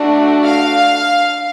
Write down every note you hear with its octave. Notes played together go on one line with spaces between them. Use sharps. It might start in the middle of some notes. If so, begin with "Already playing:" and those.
Already playing: A3 D4 F#4
F5